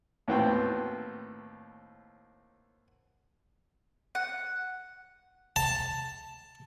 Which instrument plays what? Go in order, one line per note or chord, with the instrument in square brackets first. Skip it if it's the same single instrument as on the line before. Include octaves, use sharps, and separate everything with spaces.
[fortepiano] D#2 A2 B3 C4 F#4 G5
[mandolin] F#5
[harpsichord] A5